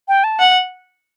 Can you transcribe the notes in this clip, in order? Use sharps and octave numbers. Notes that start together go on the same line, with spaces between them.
G5
A5
F#5